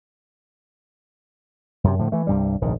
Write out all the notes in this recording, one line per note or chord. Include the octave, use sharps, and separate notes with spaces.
F#2 C3
A2 D3 F3
E3 A3
C2 G2 G3
F1 A#1 G#2 D#3